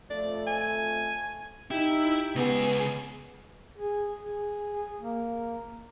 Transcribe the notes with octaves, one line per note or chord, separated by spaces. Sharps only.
F2 A3 D5
G#5
D#4 E4 G4
C#2 B3 G#4
G#4
G#4
A#3